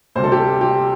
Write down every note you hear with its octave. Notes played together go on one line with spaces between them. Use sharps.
D2 C3 G3 C5
A4
G4
A4
G4